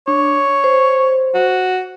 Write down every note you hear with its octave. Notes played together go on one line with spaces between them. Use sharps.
D4 C#5
C5
F#4